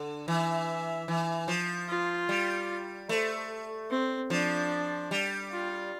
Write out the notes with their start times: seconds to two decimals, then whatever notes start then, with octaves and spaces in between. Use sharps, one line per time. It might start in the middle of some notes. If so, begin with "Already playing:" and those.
Already playing: D3
0.27 E3 E5
1.08 E3
1.48 F3
1.89 F4
2.29 G3
3.09 A3 C5
3.90 C4
4.30 F3 D4
5.11 G3
5.51 F4